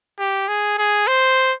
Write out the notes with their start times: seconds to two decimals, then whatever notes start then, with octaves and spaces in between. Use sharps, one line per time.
0.19 G4
0.48 G#4
0.78 G#4
1.08 C5